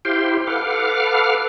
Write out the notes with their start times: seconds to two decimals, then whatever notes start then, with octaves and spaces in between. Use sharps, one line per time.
0.05 E4 G4 C5 F5 G5 C6
0.47 A4 B4 F5 F#5 D6 F6